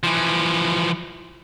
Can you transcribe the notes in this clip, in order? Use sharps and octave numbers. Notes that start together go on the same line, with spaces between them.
E3 F3